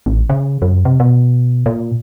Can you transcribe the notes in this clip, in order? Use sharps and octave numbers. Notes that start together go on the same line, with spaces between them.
A1
C#3
F#2
C3
B2
A#2